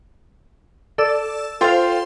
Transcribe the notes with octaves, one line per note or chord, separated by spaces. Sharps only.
A4 D5 E6
F4 A4 C5 F5 G5 C6